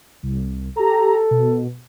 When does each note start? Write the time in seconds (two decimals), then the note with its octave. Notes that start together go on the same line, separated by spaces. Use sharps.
0.23 C2
0.77 G4 A4 A#5
1.31 B2